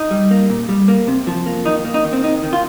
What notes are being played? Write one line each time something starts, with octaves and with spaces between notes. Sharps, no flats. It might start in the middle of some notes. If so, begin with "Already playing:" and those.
Already playing: D#4
G3
A#3
A#2
G3
A#3
C3
F3
A#3
D#3 D#4
A#3
D#4
D#3
C4
C3 D#4
D#3
F4